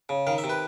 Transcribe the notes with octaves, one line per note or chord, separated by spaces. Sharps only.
C#3
D#3 F5
E5
C3
B4